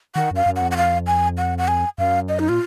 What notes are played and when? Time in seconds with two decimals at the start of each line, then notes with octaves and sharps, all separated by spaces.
0.16 D#3 F#5
0.31 F#2 F5
0.46 F#2
0.56 F#5
0.62 F2
0.71 F#5
0.77 F5
1.07 G#5
1.38 F#5
1.58 F#5
1.68 G#5
1.98 F#2 F5
2.29 D#5
2.39 D#4
2.49 A#2 F4